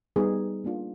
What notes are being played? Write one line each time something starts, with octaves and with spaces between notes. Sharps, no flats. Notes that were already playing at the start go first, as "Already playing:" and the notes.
G3 B3 D#4 G#4
A#3 D4 F4